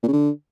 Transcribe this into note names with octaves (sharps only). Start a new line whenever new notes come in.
A#2
C#3
D3